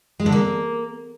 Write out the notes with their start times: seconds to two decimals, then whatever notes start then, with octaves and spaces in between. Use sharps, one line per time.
0.20 G#3
0.26 D3
0.32 A#3